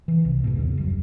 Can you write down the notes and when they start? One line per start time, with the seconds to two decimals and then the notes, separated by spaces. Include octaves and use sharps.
0.08 E3
0.25 C2
0.44 F1 G#2 B2
0.57 D#2 C#3
0.77 G1 F#2